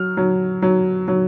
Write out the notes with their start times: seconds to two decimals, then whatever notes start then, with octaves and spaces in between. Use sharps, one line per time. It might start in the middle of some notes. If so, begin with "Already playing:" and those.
Already playing: F#3 F6
0.17 F#3
0.62 F#3
1.08 F#3